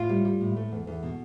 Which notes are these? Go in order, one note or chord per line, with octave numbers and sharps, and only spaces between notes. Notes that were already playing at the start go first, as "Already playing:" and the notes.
Already playing: A2 F4
G3
G3
A2
A3
E2
E2
B2